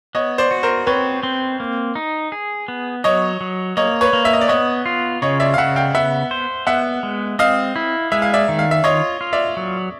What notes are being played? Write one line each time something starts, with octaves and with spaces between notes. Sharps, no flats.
B3 C#5 D#5
C5 D5
F#4
A#4 C5
C4 B4 C#5
C4
A#3
D#4
G#4
B3
F#3 C#5 D#5
F#3
A#3 C#5 D#5
B4 C#5
A#3
E5
D#5
D5
B3 C#5 D#5
F4
C#3 C#5 D#5
D5 E5
F5
C#3 E5 F#5
F5 G5
B3 E5 F#5
C5
B3 E5 F#5
G#3
C4 D#5 F5
E4
G#3 E5
F5
D5 E5
D#3
F5
E5
F4 C#5 D#5
F4
D5 E5
F#3